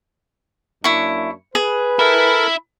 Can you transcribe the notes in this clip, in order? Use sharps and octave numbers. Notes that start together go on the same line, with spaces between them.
F#2 A#3 D4 E4 C#6
G#4 B4
E4 A4 A#4 E5